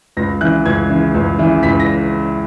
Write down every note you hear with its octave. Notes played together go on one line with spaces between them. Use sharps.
C#2 A#6
C#3 E3 F#6
C#2 G#6
C#3 E3
C#2
C#3 E3
C#2 B6
A#6